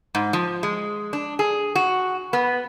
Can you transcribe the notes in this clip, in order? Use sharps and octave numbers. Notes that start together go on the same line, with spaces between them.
G#2
F3
G#3
D4
G#4
F#4
B3